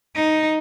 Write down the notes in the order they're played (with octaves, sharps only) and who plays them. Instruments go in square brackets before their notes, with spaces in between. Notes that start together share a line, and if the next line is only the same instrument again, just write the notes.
[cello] D#4